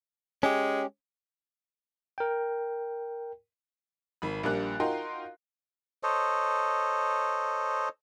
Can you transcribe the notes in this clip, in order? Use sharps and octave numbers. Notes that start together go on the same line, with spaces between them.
G#3 C#4 G4
A#4 G5
G#1 B5
A#1 G3 A#3 D4 F#6
D#4 F4 F#4 A#4 G5 C6
A4 C5 C#5 D#5